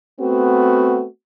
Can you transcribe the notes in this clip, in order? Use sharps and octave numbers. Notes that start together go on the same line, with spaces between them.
A3 B3 C4 F#4